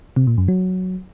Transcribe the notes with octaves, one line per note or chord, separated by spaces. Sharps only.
C3
A#2
F#2
F#3